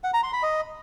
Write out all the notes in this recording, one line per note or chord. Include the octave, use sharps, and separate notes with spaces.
F#5
A#5
C6
B5
D#5